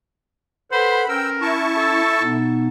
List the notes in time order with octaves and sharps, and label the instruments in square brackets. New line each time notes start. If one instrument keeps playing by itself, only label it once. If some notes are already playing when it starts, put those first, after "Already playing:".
[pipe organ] A4 B4 F#5 [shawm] C5 [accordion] B5
[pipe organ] C#4 [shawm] A#4 [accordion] G5 E6
[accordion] E4 A5 C#6
[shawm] A4
[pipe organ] B2 B3 D#4